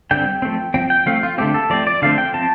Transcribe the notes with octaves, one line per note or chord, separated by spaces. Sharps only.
D3 G3 C4 G5
F3 A3 C4
F3 C4 G5
G5
F3 A3 C4 F5
F4
D3 A3 C4 G4
A4
F3 A3 C4 D5
D5
D3 F3 A3 C4 F5
G5
F3 C4 A5